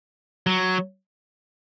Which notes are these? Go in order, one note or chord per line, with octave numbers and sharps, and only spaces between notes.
F#3